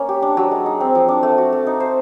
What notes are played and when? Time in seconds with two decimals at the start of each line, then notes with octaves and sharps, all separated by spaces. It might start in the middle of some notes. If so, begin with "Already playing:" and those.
Already playing: A#3 C#4 C#5
0.09 G4
0.22 D4
0.37 F#3
0.51 G#3
0.66 D#4
0.80 C4
0.95 F3
1.08 D4
1.23 A3
1.38 F#4
1.53 A3
1.67 D#4
1.80 C5